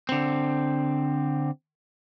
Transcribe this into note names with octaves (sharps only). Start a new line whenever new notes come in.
D3 C4